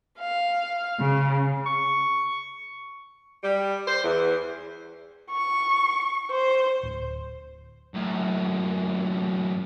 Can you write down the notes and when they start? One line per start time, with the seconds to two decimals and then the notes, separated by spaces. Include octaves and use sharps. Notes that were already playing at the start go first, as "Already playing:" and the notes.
0.19 F5
1.00 C#3
1.66 C#6
3.43 G3
3.88 C5
4.03 E2
5.30 C#6
6.30 C5
6.83 D1
7.95 F#2 A2